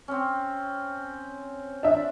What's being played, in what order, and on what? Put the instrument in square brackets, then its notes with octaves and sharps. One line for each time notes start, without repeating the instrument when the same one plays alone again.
[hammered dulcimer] C4 C#4
[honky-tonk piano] D4 E5